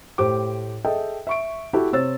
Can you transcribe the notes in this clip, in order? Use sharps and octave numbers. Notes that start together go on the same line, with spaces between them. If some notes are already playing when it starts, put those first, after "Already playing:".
A2 G4 C5 D6
G#4 A4 D#5 E5 G5
E5 C#6 D7
E4 F#4 G4 A4
C3 C5 C#5 E6 A6